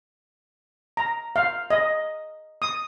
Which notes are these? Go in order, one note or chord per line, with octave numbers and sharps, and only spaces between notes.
A#5
F5
D#5
D#6